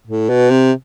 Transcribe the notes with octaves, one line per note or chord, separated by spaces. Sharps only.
A2
B2
C3